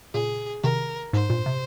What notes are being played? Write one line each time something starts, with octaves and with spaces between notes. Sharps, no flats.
A#2 C#3 G#4
C3 D#3 A#4
G#2 C5
G2 A#2
C3